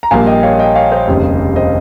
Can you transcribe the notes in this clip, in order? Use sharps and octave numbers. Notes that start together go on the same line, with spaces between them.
A#5
A#1 A#2 G3 A#3 F5 G#5
D#5 G5
C#5 F5
D#5 G5
C#5 F5
C5 D#5
F1 D#2 C#3 G3
C5 D#5